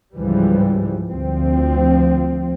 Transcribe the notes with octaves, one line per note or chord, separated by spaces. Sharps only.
C#2 G#2 E3 F3 G3
D2 F3 C4